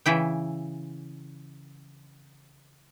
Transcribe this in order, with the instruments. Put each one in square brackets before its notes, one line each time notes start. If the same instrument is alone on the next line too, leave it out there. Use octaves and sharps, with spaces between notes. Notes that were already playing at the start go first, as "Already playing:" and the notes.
[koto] C#3 E3 E4 G5